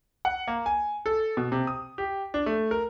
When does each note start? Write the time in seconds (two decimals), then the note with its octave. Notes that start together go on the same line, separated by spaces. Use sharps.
0.25 F#5
0.48 A#3
0.66 G#5
1.06 A4
1.37 B2
1.52 C3
1.67 D#6
1.98 G4
2.34 D4
2.46 A3
2.71 A#4